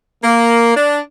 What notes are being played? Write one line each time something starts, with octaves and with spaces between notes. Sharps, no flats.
A#3
D4